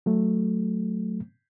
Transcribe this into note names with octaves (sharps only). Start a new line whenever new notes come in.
F#3 A3